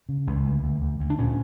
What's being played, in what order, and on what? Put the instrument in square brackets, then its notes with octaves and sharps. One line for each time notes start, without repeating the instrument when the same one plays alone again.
[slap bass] C#3
C#2
D2
D2
D2
D2
D4
A#2 C#4